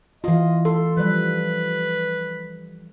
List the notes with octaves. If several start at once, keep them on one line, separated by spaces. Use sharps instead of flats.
E3 F4 D#5
A4 C6
F3 G3 B4